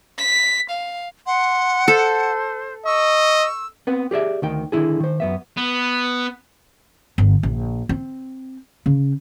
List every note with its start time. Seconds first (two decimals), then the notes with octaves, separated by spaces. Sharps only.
0.18 B6
0.70 F5
1.27 F#5 C6
1.88 A4 C5
2.86 D#5 C#6 E6
3.87 B3 C4 B4
4.11 G4 G#4 D5 E5
4.42 D2 D#3 G5
4.72 D3 D#3 E4 G#4
5.00 D#3 C5
5.20 F#2 B3 E5
5.57 B3
7.18 G1
7.43 A#1
7.89 C4
8.86 C#3